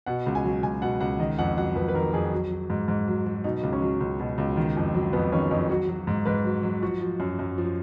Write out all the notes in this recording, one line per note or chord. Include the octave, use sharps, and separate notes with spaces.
B2 F#5
C#2
G#5
F#3
C#2 G#5
B2 F#5
C#2 F#5
D#3 D#5
F2 F#5
F#3 F#5
F2 B4
B4
D#3 A#4
F2 G#4
F#3
F#3
G#2
G#2
F#3
F#3
B2 D#4
C#2
C#4
F#3
C#2
B2
C#2
D#3
F2
F#3
F2 B3
D#3 C#4
F2 D#4
F#3 F#4
F#3
G#2
G#2 B4
F#3
F#3
F3 F#4
F3
F#2
F#2
F3